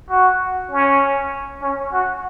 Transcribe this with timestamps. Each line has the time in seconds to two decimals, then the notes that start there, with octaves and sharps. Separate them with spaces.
0.10 F#4
0.71 C#4
1.62 C#4
1.92 F#4